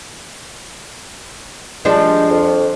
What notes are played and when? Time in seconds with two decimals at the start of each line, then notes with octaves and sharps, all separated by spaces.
1.85 F3 G3 G#3 D4
2.30 F2